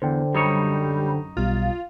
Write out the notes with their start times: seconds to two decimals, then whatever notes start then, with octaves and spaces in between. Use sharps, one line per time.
0.02 E2 D3 C5 G5
0.34 F#2 G3 D#4 C#5
1.37 B1 B2 G3 F4